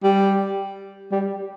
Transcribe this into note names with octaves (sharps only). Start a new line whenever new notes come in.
G3
G3